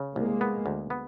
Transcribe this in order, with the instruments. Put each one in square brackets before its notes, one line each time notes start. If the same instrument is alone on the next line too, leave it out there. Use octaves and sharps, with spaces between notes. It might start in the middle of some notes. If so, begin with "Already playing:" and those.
Already playing: [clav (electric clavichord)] C#3
[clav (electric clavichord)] C2 [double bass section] G#3 A#3
[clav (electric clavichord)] B3
D2
B3